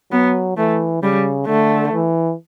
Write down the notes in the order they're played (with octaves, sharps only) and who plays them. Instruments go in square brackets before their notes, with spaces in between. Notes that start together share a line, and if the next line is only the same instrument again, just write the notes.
[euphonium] F#3 [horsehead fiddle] B3
[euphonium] E3 [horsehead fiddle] A3
[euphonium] C#3 [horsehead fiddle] G3
[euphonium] D3 [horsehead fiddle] A3
[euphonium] E3